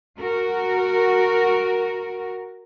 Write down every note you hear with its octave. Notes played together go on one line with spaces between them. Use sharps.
F#4 A#4